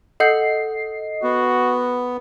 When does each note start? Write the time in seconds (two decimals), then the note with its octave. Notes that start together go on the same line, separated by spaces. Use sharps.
0.20 A4 D#5 F#5 G6 C7
1.23 B3 F#4